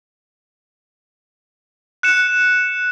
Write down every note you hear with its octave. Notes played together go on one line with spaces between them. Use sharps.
F#6 C#7 E7